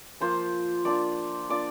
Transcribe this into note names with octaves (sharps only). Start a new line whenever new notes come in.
F3 A#3 F4 C5
A#3 D4 F4 D5
A#3 D4 F4 D5